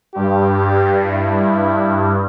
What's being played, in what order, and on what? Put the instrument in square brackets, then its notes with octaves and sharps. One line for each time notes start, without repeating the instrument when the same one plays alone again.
[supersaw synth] G2 [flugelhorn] G4
[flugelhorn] E4